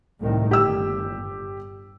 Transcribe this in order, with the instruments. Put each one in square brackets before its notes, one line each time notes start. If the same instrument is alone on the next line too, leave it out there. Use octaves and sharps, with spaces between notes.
[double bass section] C2 A2 D#3
[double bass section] G1 [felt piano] G4 E6